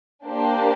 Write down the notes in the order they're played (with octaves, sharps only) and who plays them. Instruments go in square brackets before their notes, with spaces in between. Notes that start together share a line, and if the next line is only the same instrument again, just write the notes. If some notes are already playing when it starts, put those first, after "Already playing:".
[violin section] A#3 D4 G4 C5